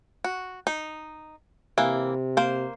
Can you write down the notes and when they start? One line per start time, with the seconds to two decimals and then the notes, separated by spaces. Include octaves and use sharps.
0.24 F#4
0.67 D#4
1.78 C3 E3 A#3
2.37 A#3 C5